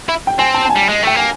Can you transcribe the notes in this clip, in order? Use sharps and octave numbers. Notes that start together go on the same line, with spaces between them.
E4
G5
C4 G#5
A5
A5
G#5
G3
G#3
A3 G5
A#3 G#5